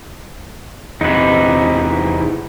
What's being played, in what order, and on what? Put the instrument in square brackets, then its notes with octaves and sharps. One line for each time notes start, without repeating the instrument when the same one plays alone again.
[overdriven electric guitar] E2 C3 [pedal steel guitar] D#4 B4